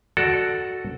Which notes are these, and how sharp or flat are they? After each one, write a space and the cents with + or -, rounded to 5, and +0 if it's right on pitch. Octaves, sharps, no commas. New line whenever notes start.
F#4 +0 A4 +0 D5 +0